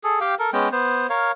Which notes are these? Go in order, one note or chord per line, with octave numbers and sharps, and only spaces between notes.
G#4 A4
G4 F5 G5
A4 A#4
G#3 B3 C#4 G5
B3 C5
A#4 C#5 F5